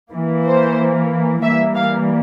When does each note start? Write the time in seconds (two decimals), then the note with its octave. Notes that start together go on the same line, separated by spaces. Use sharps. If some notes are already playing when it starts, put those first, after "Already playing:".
0.12 E3 A#3
0.46 C5
1.43 E3 G3 A#3 E5
1.75 F5